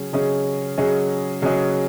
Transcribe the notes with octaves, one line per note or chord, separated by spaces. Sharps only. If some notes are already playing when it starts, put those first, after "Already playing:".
Already playing: C#3 F#3 C#4 G#4
C#3 F#3 C#4 G#4 D#5
C#3 F#3 C#4 G#4 D#5
C#3 F#3 C#4 G#4 D#5